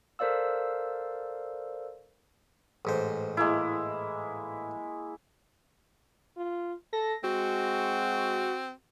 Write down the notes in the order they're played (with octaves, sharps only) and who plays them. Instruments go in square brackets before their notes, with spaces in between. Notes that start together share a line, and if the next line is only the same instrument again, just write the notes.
[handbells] A4 A#4 C5 D5 F5 E6
[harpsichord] A1 G#2 C5
[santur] G#3 A#3 E4
[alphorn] F4
[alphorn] A4 [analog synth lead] A#6
[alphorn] G#3 [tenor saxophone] C4 [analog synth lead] F#4